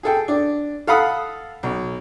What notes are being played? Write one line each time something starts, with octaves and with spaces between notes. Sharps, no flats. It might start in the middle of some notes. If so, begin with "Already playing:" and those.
G#4 A4 G5
D4
A4 F5 F#5 B5 D#6
B1